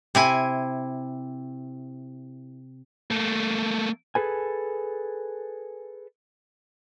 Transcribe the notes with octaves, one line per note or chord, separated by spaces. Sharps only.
C3 E4 G#5
A3 A#3
G#4 A4 B4 G#5